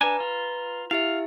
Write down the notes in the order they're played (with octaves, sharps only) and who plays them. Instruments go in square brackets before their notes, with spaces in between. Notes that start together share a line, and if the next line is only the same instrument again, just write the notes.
[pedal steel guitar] D4 G#5 [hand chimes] B4 A#5
[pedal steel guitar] F4
[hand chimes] E4 G4 E5 [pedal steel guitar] F5